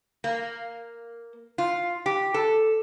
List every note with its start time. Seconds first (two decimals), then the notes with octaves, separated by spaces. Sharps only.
0.24 A#3
1.58 F4
2.06 G4
2.34 A4